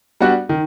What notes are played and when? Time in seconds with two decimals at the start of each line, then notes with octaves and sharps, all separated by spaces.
0.20 G3 B3 D4 F#4
0.49 D#3